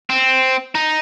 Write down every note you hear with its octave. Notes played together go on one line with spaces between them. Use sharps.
C4
D#4